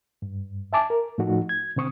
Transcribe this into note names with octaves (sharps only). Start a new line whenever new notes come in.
G2
E5 G#5 A5 D6
A#4
A2 F3 A3 D#4 F#4
G#6
B2 D3 C4 C#6 D#6